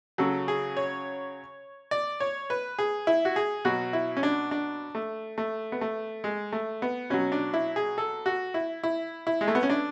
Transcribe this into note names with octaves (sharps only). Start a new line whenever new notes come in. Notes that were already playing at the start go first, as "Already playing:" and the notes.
C#3 F#3 A4
G#4
C#5
D5
C#5
B4
G#4
E4
F#4
G#4
B2 F#3 F#4
E4
C#4
D4
D4
A3
A3
B3
A3
G#3
A3
B3
B2 F#3 C#4
D4
E4
G#4
A4
F#4
E4
E4
E4
G#3
A3
B3
C#4
D4